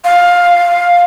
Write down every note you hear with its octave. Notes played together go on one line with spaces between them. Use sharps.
F5